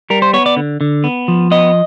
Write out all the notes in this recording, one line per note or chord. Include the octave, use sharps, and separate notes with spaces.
G3 A#4
C5
B3 C#5
D5
D3
D3
B3
F3
B3 D#5